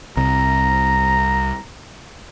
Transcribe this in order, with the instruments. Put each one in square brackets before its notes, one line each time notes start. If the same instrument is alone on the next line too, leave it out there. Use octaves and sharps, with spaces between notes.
[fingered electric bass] C2 [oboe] A#5